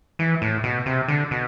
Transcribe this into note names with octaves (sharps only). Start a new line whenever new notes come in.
E3
A2
B2
C3
D3
B2